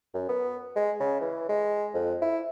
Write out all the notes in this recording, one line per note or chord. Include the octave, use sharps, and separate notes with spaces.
F#2
B3
G#3
C#3
E3
G#3
F2
E4